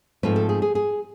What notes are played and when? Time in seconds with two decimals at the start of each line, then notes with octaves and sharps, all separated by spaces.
0.23 G#2 F3 A3 C4 B4
0.36 A4
0.49 G#4
0.62 G#4
0.75 G#4